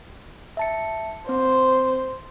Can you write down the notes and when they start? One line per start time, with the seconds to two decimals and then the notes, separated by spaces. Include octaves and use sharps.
0.57 E5 A5 C#7
1.29 C4 C5